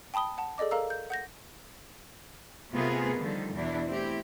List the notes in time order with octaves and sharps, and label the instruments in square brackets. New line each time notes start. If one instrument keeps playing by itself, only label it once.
[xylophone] G5 A5 B5 D#6 G7
F#5 A5
G#4 A4 D5 D#5 D6
A4 A#4 F5 A#5 E6
G6
F#5 G6 A#6
[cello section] C3 A3 B3 F4 G#4 A#4
D3 D#3 F3 G3 A4
E2 B2 E3 D4 E4
A3 C4 E4 G4